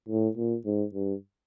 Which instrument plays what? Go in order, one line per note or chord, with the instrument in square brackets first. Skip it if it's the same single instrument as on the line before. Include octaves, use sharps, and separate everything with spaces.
[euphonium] A2
A#2
G#2
G2